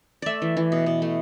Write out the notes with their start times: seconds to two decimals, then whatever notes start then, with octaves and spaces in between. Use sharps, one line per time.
0.22 A3 D5 E5
0.42 E3
0.57 E3
0.72 B2
0.86 B2
1.02 A3